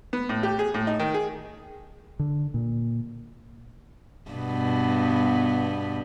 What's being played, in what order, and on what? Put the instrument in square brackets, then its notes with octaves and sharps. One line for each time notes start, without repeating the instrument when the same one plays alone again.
[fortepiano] B3
A2
G4
G#4
A2
D#4
D#3
G#4
[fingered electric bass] D3
A#2
[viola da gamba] G2 B2 B3